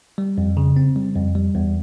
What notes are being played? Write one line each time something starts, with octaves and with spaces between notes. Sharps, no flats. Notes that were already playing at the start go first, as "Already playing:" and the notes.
G3
F2
C#3
C4
G3
F2
G3
E2